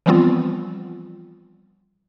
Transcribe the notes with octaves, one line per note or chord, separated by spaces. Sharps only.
E3 F3 G3 B3 C4 F4